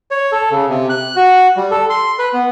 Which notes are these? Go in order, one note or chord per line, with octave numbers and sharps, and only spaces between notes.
C#5
A4
C#3
C3
F#6
F#4
G3
A4
C6
B4
B3